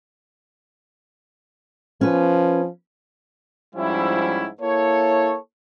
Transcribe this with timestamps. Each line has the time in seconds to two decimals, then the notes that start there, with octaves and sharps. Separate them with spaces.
2.01 F3 C#4 B4
3.75 G#2 F3 G3 C#4 E4
4.61 A#3 E4 A4 C#5